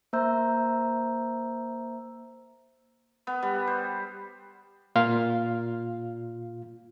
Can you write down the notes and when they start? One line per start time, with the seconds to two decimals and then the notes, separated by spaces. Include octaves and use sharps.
0.13 A#3 C5 E5 A#5 E6 G6
3.27 B3
3.42 G3
3.67 C5
4.96 A#2 F4 F5